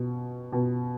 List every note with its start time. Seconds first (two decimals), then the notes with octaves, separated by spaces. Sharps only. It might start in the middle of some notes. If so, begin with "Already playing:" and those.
Already playing: B2
0.52 B2